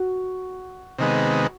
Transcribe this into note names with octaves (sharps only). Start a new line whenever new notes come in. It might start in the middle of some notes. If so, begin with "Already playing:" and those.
Already playing: F#4
C3 D#3 G#3 B3